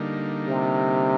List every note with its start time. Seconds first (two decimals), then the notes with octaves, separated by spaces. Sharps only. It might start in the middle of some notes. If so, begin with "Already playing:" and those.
Already playing: D3 G3 A#3 D#4
0.47 C3